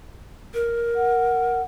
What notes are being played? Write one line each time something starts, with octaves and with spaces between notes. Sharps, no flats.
A#4
F#5